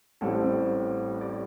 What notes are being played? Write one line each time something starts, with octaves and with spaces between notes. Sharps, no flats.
A1 A2 G3 C4 A4
C5
D5